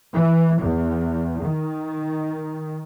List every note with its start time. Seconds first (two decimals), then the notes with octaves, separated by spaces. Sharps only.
0.14 E3
0.62 E2
1.44 D#3